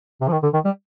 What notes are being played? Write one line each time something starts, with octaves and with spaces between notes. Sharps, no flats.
C3
F3
D#3
D3
D#3
G3